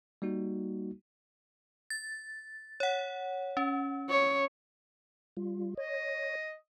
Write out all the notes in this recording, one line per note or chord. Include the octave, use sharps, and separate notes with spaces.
G3 A#3 D#4 F#4
A6
C#5 F#5
C#4
C#5
G3 F4
C#5 D#5